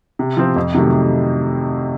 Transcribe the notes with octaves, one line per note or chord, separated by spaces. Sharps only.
C3
F3 C4 F4
F2
C3 D#3 F#3 A3